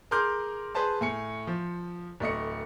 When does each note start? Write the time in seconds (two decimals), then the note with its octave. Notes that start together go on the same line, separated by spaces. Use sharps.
0.11 G#4 A#4 C6 D6 F6 G6
0.75 G#4 B4 C5 A5 C6
1.01 A2 G#5 C#7
1.47 F3
2.20 D1 A3 D#5 C#7